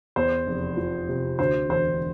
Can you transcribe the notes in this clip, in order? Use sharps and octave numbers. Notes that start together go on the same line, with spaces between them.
E2 C5
F1
F3
C3
D2 C5
E1 C5